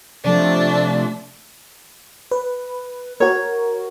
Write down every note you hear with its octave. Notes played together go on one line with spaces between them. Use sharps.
C3 F3 A3 D4
B4
F#4 A#4 C#5